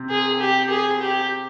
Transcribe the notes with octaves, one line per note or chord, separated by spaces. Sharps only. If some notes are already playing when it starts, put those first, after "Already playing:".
Already playing: C3 C4
G#4
G4
G#4
G4